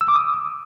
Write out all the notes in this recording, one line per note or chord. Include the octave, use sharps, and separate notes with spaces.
E6
D6
D#6